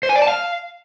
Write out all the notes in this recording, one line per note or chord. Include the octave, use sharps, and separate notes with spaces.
C5
G#5
D5
A5
F5